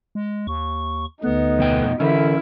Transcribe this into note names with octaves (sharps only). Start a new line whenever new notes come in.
G#3
D#2 C#6
D2 D3 B3 D#4 B4
F2 B2 G5
D3 E3 C#4 E4 A4 A#4